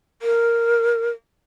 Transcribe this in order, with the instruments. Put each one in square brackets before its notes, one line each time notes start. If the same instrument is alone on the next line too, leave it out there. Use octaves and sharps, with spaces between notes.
[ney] A#4